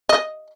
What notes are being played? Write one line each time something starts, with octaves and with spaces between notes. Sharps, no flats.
D#5